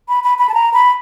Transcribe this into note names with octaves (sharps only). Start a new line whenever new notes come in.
B5
B5
B5
A5
A#5
B5